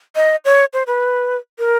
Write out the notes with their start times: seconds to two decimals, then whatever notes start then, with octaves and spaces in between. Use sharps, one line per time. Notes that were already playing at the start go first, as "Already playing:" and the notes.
0.16 D#5
0.45 C#5
0.73 C5
0.87 B4
1.59 A#4